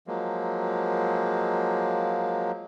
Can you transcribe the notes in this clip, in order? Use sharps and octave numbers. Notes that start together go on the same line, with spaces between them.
F3 F#3 G#3 A#3